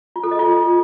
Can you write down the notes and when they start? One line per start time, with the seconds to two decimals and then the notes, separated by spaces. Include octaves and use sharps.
0.16 F4
0.23 A4
0.31 D#5
0.39 F4